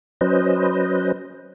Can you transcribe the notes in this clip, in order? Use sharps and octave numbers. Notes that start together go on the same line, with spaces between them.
F#3 C#4 B4 C5 D#5